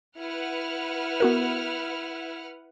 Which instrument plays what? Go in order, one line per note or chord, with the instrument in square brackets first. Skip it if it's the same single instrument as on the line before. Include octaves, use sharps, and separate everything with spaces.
[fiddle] E4 [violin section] B4 F#5 F6
[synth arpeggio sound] B3 F#4 A#4